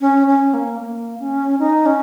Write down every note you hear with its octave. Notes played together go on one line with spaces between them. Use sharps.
C#4
C#4
A#3
A#3
C#4
D#4
C#4